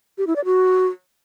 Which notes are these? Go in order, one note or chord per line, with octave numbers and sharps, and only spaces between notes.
G4
E4
D5
F#4